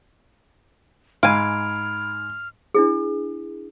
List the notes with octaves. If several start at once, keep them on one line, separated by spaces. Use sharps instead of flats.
G#2 F5 G#5 B5 F6 G#6 D7
D4 E4 G#4